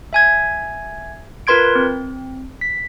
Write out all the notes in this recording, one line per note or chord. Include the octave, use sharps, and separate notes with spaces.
E5 G#5 G#6
F4 A#4 B4 C6 G#6 D7
C4
B6